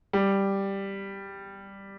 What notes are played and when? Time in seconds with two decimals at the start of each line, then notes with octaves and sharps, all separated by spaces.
0.13 G3